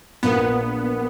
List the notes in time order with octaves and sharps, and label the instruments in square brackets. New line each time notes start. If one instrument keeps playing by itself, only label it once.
[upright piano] A#1 A#2 A#3 [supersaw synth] B3